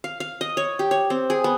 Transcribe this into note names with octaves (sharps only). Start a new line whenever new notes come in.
F5
F5
D#5
C#5
G4
C#5
C4
G#4
B3